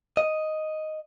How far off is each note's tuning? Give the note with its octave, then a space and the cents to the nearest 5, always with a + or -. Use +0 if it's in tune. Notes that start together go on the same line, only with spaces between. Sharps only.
D#5 +0